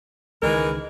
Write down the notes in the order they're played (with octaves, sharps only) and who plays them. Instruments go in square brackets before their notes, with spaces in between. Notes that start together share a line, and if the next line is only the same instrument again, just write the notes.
[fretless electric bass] C#2 D#3 [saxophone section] E3 G#3 A#4